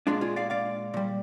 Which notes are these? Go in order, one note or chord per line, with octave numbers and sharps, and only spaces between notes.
A#2 G#3 D4 F4
F4 G#4
D5 F5
D5 F5
A#2 G3